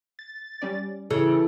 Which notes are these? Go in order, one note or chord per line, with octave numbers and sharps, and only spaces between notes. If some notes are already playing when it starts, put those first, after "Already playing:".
A6
G3 C#4 D5
C#3 E3 A4